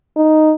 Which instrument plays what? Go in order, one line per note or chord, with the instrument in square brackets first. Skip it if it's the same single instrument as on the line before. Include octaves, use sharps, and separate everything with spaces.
[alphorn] D#4